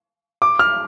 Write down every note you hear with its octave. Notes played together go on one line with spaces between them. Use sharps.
D6
F6